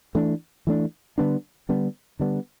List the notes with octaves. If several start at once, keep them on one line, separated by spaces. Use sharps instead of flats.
E3 A3 D4
E3 A3 D4
D3 G3 B3 D4
D3 G3 B3 D4
D3 G3 B3 D4